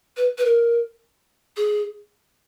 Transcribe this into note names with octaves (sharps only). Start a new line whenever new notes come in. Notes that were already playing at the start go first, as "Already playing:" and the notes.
B4
B4
A#4
G#4